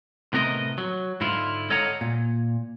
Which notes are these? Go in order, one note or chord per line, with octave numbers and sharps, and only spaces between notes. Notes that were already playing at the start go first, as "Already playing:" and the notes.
A2 C3 B3 A#4 C#5 D#5
F#3
G#2 D3 E4 F4
A4 C#5 D#5 F5 F#5 A#5
A#2